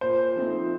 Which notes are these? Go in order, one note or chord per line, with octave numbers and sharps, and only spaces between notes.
A#2 C5
F3 A3 C4 D#4